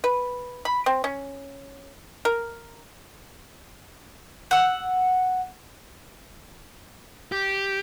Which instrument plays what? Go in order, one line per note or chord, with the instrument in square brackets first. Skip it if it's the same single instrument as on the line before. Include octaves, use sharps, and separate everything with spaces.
[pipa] B4
B5
C4
C#4
A#4
[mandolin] F#5 E6
[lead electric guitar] G4